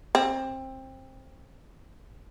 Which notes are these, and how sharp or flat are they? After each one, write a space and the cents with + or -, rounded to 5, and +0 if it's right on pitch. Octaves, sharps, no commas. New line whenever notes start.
C4 +20